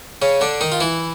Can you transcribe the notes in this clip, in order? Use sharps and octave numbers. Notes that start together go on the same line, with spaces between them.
C#3 C#4
D3 D4
D#3 D#4
F4
E3 E4